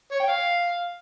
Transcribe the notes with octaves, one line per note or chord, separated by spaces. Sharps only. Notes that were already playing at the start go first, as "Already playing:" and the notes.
C#5
G5
F5